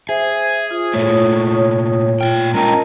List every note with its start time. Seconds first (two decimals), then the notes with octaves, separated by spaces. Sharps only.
0.09 G#4 C5 E5
0.71 F4 D#6
0.94 A#2 A3 C#5
2.21 A#2 G3 F4 G5
2.54 G#3 C#4 A#4 D#5 G5 A5 A#5